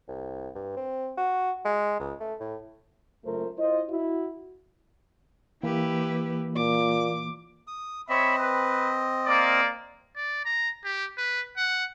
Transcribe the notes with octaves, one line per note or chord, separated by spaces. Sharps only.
C2
G2
C4
F#4
G#3
C#2
A3
A2
F#1 F#2 A3 F4 A#4 C5
E4 F4 C5 D#5
E4 F#4
E3 A#3 E4 G4 B4
A#2 D6
D#6
C4 C#5 D#5 E5 B5
B4
A#3 D5
D5
A#5
G4
B4
F#5